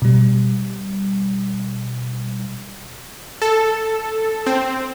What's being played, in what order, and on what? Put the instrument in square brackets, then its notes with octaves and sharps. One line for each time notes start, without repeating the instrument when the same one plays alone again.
[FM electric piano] B2 G3
[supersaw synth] A4
C4